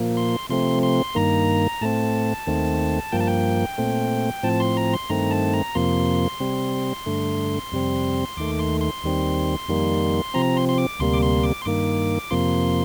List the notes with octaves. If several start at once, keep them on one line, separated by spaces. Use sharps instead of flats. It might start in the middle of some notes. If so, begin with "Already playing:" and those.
Already playing: A#2 F3 A#3
C6
C3 F3 A3 C4 C6
C6
G2 D#3 A#3 A#5
A2 A3 C4 A5
D#2 D#3 A3 C4
G2 F3 A#3 G5
A5
G5
A#2 A3 C4
A2 F3 C4 A5
C6
A#5
C6
G2 D#3 A3 C4 A#5
A5
A#5
F2 C3 F3 A#3 C6
C3 G3 C4
G2 D3 A3
F2 C3 G3 C4
D#2 D#3 A3 D6
C6
C6
D#2 D#3 G3 C4
F2 D#3 G3 A#3
C3 F3 C4 A#5
C6
C6
D6
D2 C3 G3 A#3 C6
D6
C6
D6
C6
G2 D#3 A#3 D6
F2 C3 F3 A#3 C6